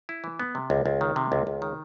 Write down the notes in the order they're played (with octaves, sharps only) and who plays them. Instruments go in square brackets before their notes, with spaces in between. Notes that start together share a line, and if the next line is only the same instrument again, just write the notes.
[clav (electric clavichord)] E4
E3
B3
C3
C#2
C#2
D#3
C3
C#2
C#2
D#3